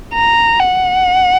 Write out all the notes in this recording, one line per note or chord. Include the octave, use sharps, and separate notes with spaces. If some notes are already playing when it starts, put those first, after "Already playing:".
A#5
F#5